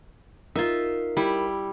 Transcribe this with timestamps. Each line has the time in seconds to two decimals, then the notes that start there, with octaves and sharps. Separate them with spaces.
0.55 D#4 F4 A#4 E5
1.17 G3 E4